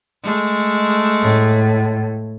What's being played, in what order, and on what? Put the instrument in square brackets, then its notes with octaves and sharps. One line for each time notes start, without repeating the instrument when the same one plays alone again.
[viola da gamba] G#3 A3
[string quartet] A2